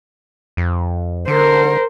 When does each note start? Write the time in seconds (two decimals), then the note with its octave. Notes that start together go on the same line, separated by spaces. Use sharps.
0.57 F2
1.28 D3 A#4 C5